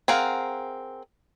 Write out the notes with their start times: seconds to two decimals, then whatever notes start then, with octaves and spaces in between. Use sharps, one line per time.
0.08 C4 G#4 A#4 F5 F#5